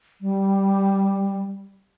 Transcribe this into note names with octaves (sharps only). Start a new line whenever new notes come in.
G3